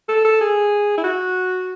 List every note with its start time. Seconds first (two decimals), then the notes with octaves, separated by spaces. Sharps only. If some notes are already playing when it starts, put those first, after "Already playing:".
0.09 A4
0.25 A4
0.41 G#4
0.98 E4
1.04 F#4